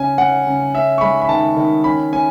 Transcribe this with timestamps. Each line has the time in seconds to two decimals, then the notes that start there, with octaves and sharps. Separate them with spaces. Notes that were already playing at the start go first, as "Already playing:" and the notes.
Already playing: C#3 C#4 G#5
0.18 C#4 F#5
0.47 C#3
0.74 C#4 E5
0.98 C#6
1.01 G#3 B5
1.21 B5
1.29 D#3 A5
1.56 D#3
1.84 C#4 B5
2.12 C#4 G#5